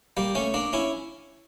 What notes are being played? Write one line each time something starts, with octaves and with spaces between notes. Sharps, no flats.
G3 A#3
A3 C#4
A#3 D4
C#4 E4